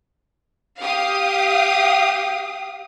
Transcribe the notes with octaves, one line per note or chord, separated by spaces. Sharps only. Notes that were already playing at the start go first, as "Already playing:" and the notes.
G4 F5 D#6